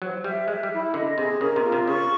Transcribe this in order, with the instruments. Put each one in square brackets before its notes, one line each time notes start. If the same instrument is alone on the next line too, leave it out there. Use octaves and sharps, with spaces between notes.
[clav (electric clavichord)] F#3 [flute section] C5
[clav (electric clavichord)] G3 [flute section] E5
[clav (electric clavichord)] G#3 [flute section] E5
[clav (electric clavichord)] G3
[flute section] E4
[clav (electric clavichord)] D3 [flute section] D#5
[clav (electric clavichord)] C3 [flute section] G#4
[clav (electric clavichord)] C#3 [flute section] A#4
[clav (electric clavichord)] C3
[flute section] F4
[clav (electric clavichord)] C3
[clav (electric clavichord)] C#3 [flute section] C#6